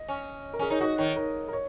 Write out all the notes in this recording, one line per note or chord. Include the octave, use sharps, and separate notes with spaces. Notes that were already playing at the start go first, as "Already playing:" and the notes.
Already playing: D#5
C#4
A#4
C#4 G#4
D#4 C#5
F#4 D#5
D#3 C#5
A#4
A#4
C#5